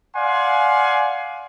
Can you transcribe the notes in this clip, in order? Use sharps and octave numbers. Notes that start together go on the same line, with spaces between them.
D5 F5 F#5 G#5 C6